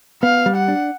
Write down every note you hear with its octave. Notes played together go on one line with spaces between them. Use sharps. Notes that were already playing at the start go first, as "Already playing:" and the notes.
B3 F5
G3
F#5
D4